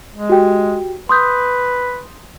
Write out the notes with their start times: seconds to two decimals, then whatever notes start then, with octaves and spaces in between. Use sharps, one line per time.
0.15 G#3
0.29 F#4 G4 G5
1.09 B4 C6 D#6 G6